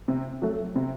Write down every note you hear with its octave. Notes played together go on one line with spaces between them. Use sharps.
C3
F#3 A3
C3